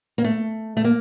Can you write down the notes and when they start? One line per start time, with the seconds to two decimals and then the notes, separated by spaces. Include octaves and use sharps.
0.18 A#3
0.24 A3
0.77 A3
0.84 A#3